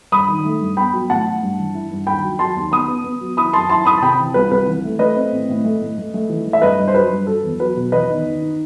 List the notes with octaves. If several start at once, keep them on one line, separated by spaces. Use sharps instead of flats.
G2 B5 D#6
D#3
A3
G2
B3 G5 B5
F#3
A2 F#5 A5
A2
G2
E3
E4
G2
D#2 G5 B5
F#3
F#3 A5 C6
D#2
B3 B5 D#6
B3
B3
F#3
E4 B5 D#6
F#2 A5 C6
E4 A5 C6
E4 B5 D#6
A5
C3 G5 B5
E3
C2 B4
C2 B4
E3
A3
A3 B4 D#5
C4
A2
A2
A3
A2
A3
A3
E3
A3
E5
G2 B4 D#5
G2
C5
F#3 B4
G2
F#3 A4
E2
F#3 B4
B2
E2 B4 D#5
D#3
D#3
D#4